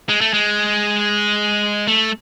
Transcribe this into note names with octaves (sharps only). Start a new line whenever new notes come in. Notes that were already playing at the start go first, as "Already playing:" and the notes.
G#3
A3
G#3
A3